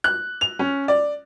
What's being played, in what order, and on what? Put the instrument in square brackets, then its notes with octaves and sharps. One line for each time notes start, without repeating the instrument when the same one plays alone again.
[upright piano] F#6
F7
C#4
D5